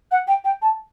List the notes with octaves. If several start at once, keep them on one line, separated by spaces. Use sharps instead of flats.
F#5
G5
G5
A5